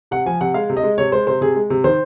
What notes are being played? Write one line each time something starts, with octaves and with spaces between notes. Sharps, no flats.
C3 F#5
F3 G#5
C3 F#5
G#3 F5
C3
D#5
G#3
C3 C#5
G#3 C5
C3 C5
C3 G#4
G#3
C3
D#3 C5